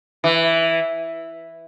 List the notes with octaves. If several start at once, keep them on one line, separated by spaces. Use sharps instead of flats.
E3